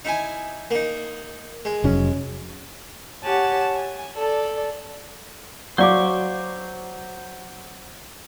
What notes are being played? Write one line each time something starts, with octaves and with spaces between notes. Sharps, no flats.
D#4 E4 G#5
A#3 D#4
G#3
F1 F#3 C#4
G4 C#5 F#5 G#5 A5
G#5
A4 D5
F#3 C5 D5 F5 C#6 D6